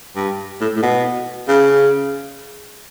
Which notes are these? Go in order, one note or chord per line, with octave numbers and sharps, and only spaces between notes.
G2
A2
A2
B2
C#3